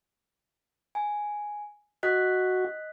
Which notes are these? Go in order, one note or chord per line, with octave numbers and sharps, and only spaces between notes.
G#5
F#4 D#5 F#6 B6